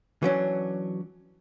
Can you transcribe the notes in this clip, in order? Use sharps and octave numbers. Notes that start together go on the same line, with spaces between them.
E3 F#3 C#4 D4